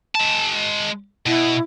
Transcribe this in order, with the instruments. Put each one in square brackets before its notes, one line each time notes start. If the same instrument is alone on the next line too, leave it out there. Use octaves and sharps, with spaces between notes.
[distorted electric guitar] G#3 A5
[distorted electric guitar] B2 [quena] E4